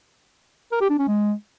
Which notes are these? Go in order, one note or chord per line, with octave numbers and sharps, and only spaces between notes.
A#4
G4
D4
C#4
G#3